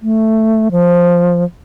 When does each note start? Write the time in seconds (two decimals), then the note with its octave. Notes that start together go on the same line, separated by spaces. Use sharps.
0.02 A3
0.71 F3